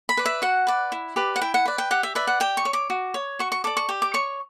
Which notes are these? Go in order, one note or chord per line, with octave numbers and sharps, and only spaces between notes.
B5
B4 D5
E5
F#4 F#5
B4 D5
E4
G4 B4 D5
F#5
E4 G5
F#5
B4 D5
G5
G4 F#5
E5
B4 D5 E5
F#5
G4 G5
C#6
C#5
D6
F#4
C#5
F#4 C#6
C#6
A4 D5 D6
C#6
G4
D6
C#5 C#6